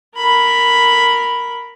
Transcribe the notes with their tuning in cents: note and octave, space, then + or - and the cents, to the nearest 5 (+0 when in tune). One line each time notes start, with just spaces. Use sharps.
A#4 +0 B5 +0